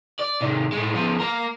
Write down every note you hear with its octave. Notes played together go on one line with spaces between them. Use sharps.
D5
C3 D#3
A2 G#3
F3 B3
A#3 A#4